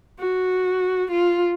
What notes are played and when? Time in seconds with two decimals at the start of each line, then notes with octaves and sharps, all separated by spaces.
0.20 F#4
1.12 F4